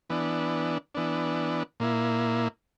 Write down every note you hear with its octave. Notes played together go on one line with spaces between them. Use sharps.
E3 B3 D4
E3 B3 D4
A#2 A#3 E4